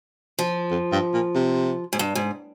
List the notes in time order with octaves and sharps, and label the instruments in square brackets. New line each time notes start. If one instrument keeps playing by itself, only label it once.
[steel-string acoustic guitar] F3
[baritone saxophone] F2
G2
A#2
C3
[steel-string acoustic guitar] G#2
G2
G#2